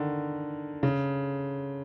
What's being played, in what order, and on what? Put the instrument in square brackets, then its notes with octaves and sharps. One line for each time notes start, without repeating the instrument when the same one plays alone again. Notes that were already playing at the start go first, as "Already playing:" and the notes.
Already playing: [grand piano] D3 D#3
C#3